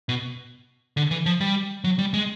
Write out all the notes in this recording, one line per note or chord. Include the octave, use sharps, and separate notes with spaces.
B2
D3
E3
F3
G3
F#3
G3
G#3